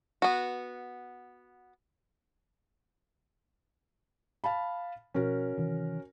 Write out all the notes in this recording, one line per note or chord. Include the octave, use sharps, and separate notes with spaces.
B3 F#4
F5 A5 B5
B2 F3 C#4 F#4 A#4
C3 D#3 E3